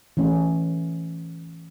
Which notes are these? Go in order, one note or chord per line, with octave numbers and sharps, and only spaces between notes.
E3 A3 C#4